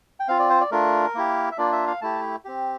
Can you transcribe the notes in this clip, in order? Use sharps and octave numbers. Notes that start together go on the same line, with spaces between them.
G5
C4 F4 F5
D5
C5
D5
A3 D4 F4 A#4
A#3 E4 G4
E5
A#3 D4 F4 D5
E5
F5
A3 E4 G4 A5
C4 G4